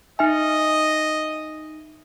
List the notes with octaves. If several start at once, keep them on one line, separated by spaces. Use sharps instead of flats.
D#4 D#5 E5 G#5